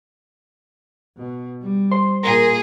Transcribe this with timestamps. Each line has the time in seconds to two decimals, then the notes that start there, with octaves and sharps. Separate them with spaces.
1.17 B2
1.62 G3
1.91 C5 C6
2.23 A#2 G#4 A#4